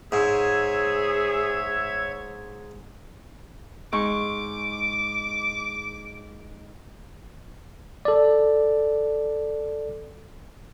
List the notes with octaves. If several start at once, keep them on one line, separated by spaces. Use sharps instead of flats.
G#2 G#4 C#5 E5 G#6
G#2 C#6 D6
A4 D5